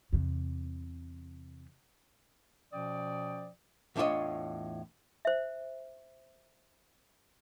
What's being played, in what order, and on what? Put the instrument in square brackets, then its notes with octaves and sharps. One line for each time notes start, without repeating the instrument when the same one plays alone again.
[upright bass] E2 C3
[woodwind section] B2 F3 C#4 D5 G5 D#6
[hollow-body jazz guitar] E2 A2 D4 F4 C#5 D#5
[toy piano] C5 E5